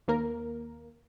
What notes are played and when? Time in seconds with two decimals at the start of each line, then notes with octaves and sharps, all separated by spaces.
0.08 D#2 A#3 A#4